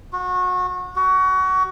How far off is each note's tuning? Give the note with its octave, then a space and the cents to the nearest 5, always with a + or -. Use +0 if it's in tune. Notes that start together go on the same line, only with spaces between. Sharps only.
F#4 -25
F#4 +25